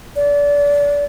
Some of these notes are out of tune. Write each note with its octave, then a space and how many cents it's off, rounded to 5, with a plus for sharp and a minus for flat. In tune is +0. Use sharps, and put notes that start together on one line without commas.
D5 -30